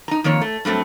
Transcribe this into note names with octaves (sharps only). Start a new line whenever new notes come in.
D#4 A#5
F2 D#3 A#3 C#5
A3
G2 F#3 A3 C4